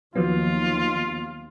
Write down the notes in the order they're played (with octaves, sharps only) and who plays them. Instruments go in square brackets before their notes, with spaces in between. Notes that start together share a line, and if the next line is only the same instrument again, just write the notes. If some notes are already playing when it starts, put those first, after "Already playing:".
[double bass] D#2 D#3 [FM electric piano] F3 F#3 B3 [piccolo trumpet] F4